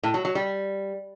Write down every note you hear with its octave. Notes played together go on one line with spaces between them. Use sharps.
A2
F#3
F#3
G3